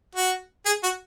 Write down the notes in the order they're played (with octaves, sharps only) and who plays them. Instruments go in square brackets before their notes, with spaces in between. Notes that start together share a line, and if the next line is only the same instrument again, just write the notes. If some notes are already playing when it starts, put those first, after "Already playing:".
[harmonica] F#4
G#4
F#4